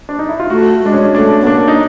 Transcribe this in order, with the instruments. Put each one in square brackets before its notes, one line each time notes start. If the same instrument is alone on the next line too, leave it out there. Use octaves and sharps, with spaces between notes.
[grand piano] D4
D#4
E4
F4
[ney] A3 [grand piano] F#4
[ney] G#3 [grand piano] D4
[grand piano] C#4
[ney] A3 [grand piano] D4
[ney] B3
[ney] A#3 [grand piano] D4
[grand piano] D#4